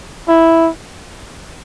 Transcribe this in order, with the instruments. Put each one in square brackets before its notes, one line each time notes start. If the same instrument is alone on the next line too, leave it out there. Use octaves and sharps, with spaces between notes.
[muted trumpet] E4